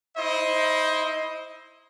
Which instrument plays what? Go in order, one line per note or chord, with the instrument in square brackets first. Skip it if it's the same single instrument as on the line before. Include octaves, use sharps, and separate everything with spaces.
[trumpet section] D#4 E4 C5 D#5